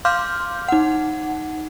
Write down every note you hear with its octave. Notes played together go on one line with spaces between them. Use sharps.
F5 C6 D6 F6 G6
D#4 F#5